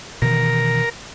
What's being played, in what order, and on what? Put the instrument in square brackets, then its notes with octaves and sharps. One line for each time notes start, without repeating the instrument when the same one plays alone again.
[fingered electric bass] B2 D#3 E3 [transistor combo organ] A#4